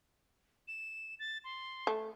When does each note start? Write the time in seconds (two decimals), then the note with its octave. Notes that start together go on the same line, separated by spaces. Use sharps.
0.68 E7
1.20 A6
1.44 C6
1.87 A3